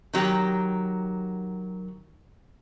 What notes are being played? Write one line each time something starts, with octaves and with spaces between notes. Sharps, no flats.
D#3 F#3 G4